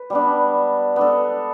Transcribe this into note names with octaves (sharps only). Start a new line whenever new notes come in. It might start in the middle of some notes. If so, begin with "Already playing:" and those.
Already playing: B4
G3 B3 D4
B3 D4 A4